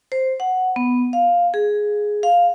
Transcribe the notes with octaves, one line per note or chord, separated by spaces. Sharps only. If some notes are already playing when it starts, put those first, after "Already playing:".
C5
F#5
B3
F5
G#4
F5